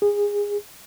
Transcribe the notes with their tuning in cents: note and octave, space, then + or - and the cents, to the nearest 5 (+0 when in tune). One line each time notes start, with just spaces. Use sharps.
G#4 -20